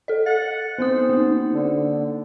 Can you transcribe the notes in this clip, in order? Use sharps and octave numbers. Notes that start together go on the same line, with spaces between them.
A4 D#5
F#5 A6
B3 C4 C5 D#6
A#3 D#4
D3